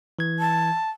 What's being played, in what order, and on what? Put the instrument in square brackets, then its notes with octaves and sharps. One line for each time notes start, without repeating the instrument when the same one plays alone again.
[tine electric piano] E3 G#6
[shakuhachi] A5